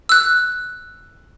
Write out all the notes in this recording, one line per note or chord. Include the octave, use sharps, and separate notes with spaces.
E6 F#6